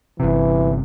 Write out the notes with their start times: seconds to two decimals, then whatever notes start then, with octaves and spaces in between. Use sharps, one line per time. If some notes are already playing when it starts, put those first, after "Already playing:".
0.20 G1 C3 E3